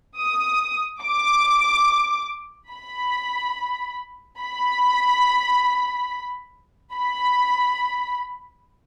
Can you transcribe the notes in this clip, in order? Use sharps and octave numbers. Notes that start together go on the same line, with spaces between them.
D#6
D6
B5
B5
B5